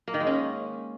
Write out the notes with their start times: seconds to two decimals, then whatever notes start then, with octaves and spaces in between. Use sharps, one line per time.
0.08 A#3
0.14 D#3
0.20 G#3
0.27 C#4